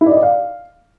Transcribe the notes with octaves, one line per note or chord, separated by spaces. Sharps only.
E4
D5
D#5
D5
F5